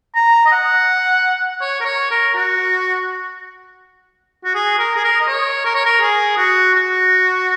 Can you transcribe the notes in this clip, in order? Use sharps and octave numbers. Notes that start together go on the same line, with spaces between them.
A#5
D#5
F#5
C#5
A#4
C#5
A#4
F#4
F#4
G#4
A#4
G#4
A#4
D#5
C#5
A#4
C#5
A#4
G#4
F#4
F#4